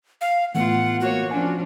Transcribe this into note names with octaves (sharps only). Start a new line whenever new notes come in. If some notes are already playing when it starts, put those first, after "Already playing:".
F5
A2 E3 A3 B3 F4 F#5
A#3 F#4 C#5
F3 C#4 D4 G#5